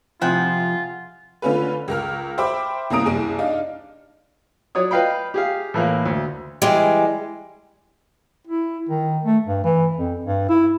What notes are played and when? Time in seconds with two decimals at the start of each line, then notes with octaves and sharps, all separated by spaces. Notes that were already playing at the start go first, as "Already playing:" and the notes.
0.21 C3 F3 E4 F4 G#4 F#5 G5
1.42 D3 A3 C#4 F4 B4
1.88 C#2 A#4 F6
2.38 C5 E5 G5 B5 D6
2.90 C2 A#3 C#4 A#5 D#6 D7
3.05 F#1 C2 G#4
3.39 D4 D#4 F5
4.75 F#3 C#5 D5 D#6
4.91 B4 D#5 F5 G5 B5
5.34 G4 G#4 F5
5.74 A2 E3 A#3
6.05 D2
6.62 E3 G3 G#3
8.47 E4
8.89 D#3
9.24 A3
9.47 G2
9.64 E3
9.97 F2
10.24 G2
10.49 E4